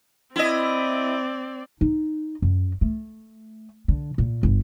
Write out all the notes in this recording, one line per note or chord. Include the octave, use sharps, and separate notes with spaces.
C4 E4 D5 D#5
D#4
F#2
A3
D3
A#2
G1